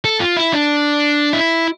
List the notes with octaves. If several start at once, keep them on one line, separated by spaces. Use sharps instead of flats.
A4
F4
E4
D4
E4